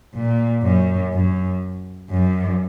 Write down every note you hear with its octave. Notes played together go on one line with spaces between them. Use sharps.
A#2
F#2
F#2
F#2